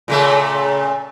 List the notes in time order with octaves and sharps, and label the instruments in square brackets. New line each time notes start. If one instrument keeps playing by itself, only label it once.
[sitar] A#2 C#3 A3